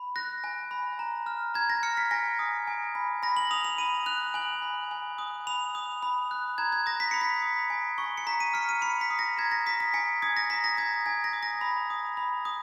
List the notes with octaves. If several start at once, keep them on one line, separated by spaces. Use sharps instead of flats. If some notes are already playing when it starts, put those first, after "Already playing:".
Already playing: B5
F#6 A#6
G#5
B5
A#5
F6
A#5 G#6
A#6
F6 C#7
B6
G#5 A#6
D#6
G#5
B5
B5 A#6
F#7
D#6 F7
F7
B5 D#7
F#6 F7
G#5 F#7
B5
G#5
D#6
B5 F7
D#6
B5
F#6
A#5 G#6
G#6
D#6 A#6
B6
B5 C#7
B6
D#6
G#5
C#6
C#7
A#5 B6
D#7
F6 C#7
D#7
B5 C#7
B6
D#6
A#6
A#5 G#6
A#6
D#6 B6
B6
G#5 C#7
D#6 G#6
A#6
A#5 B6
A#6
D#6 G#6
G#5 G#6
A#6
D#6
A#6
B5
D#6
B5
D#6